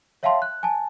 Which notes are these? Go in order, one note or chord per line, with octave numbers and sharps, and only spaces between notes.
C#5 E5 F5 G5 A5 C6
F#6
G#5 A5